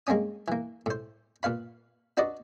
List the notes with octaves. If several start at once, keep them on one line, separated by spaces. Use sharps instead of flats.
G#3 A#3 C4 C#4 D#6
E3 A#3
A2 C5
A#2 B4 F5 B5
D4 F#4 B4 D5 D#5